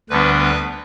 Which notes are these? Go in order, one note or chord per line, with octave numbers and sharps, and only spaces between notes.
D2 D3 G3 B3 D4 B4
B4